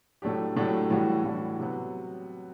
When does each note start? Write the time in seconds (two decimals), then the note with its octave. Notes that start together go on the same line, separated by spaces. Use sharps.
0.22 A2 F#3 A3 D4 G4
0.56 A2 F#3 A3 D4 G4
0.90 A2 E3 G3 D4 F#4
1.25 A2 E3 G3 D4 F#4
1.59 C3 F#3 B3